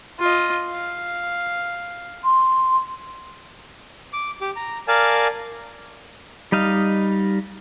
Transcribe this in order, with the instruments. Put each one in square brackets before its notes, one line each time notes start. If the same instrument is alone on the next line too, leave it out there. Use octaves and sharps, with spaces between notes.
[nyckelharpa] F4 D#5
F5
[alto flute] C6
[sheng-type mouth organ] D6
G4 D6
A#5
A#4 D5 F5 G#5 A5
[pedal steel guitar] G3 D#4 D#5 F5